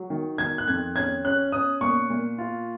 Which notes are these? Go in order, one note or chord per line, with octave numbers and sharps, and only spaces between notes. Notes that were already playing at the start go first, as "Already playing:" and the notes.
Already playing: F#3
D#3
D#3 G#6
F#6
F2 G#6
C#4 G#6
C#4 F#6
C#4 D#6
A#2 C#6
A#2
F4